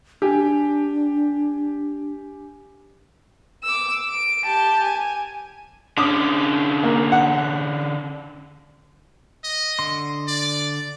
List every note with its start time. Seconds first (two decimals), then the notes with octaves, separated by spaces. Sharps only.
0.22 D4 G4 G#5
3.63 D6 E6
4.10 D7
4.45 G4 A5
4.84 G#5
5.98 D3 C#4 D6 D#6
6.84 A#3
7.12 F#5
9.44 D#5
9.79 D3 C6
10.28 D5